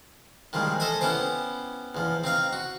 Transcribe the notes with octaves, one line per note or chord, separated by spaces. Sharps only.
D#3 F3 G3 G#3
A4 C5 D#5 E5 G#5
B3 C#4 E4 G4 C5
E2 F3
C4 D#4 F5
F#4